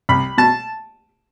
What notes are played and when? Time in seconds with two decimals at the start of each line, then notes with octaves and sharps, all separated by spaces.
0.09 C2 B5
0.38 B2 A5